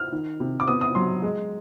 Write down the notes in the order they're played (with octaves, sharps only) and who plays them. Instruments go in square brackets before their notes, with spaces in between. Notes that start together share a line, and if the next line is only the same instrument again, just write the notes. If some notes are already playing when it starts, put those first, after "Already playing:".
Already playing: [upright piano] F6
D#3
C3
D6
B3 D#6
D#6
F#3 C6
G#3